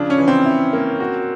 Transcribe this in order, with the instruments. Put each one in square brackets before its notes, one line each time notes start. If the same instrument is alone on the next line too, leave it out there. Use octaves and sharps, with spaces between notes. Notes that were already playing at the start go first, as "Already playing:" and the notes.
Already playing: [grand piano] C#3 F3 [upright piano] D4
[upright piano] C#4
[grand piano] E3
[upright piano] C4
[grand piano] E4
A#3
F#4